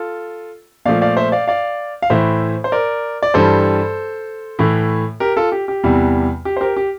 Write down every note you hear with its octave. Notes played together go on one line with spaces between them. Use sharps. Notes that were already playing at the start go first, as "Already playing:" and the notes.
Already playing: F4 A4
A#2 F3 A3 D5 F5
D5 F5
C5 E5
D5 F5
D5 F5
F5
A2 E3 A3 C5 E5
C5
A#4 D5
D5
G2 E3 G3 A4 C5
A2 E3 A3
G4 A#4
F4 A4
G4
G4
E2 C3 E3 G3
G4
C5
G4 A#4
G4